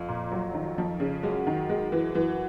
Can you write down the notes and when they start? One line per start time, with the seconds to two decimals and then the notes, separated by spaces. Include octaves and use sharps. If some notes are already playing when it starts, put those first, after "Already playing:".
Already playing: F2
0.08 A#2
0.31 F#3
0.54 D#3
0.78 F3
1.00 C#3
1.23 F#2 G#3
1.47 D#3
1.69 G#3
1.92 E3
2.14 F#2 E3